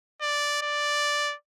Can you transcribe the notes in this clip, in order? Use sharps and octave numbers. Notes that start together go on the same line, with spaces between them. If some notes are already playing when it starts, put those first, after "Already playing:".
D5
D5